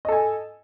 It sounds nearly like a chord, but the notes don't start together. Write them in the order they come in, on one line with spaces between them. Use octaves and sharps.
D#5 A4 G#5